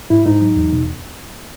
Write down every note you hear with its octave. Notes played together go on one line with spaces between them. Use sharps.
G#2 E4
G#2 D#4
F#3
E2
B2